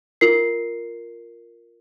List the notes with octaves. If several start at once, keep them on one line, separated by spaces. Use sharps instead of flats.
F4 A#4 C7